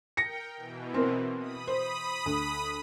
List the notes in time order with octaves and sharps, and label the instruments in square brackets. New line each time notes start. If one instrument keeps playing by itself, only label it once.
[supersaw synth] A#4 G5 [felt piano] A#6 C#7
[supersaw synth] B2 E3
[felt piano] C4 A#4
[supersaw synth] B5 D#6
[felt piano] C5
D2